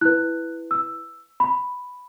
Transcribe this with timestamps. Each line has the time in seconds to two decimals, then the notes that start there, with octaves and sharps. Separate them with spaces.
0.01 E4 B4 F#6
0.71 E6
1.40 B5